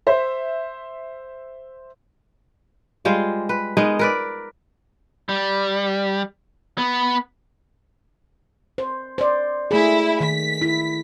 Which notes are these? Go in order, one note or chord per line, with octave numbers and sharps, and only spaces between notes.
C5 E5
G3 G#3 F4 C5
B4
G#3 B3 D#4 A#4
A#4 B4 D5
G3
B3
C5
C5 D5
A3 E4 G#4
D#3 B6
E4